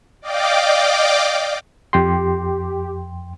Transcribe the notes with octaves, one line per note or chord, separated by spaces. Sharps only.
D5 D#5 F5 G5 D6
F2 G4 G5 C6